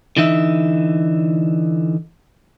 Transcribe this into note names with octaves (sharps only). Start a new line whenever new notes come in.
D3 E3 D#4 E5